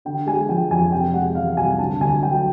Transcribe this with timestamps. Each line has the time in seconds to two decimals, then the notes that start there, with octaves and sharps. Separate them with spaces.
0.05 D3 G5
0.26 G#3 G#5
0.49 F3 G5
0.70 F2 G#5
0.92 C3 G5
1.14 G#3 F#5
1.35 E3 F5
1.57 C2 G#5
1.78 D3 A5
2.01 D2 G#5
2.23 F#3 G5
2.34 G5